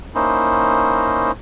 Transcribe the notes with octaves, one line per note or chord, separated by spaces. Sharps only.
A#3 C#4 D#4 E4 C5